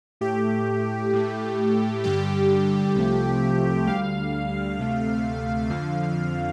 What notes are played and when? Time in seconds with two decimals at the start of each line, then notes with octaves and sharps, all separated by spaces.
0.21 A2 A3 G4
1.13 A2 A3
2.04 G2 D3 G3 G4
2.95 C2 C3 F3 A3
3.87 D2 D3 G3 F5
4.78 D2 C3 A3
5.70 F2 D3 F3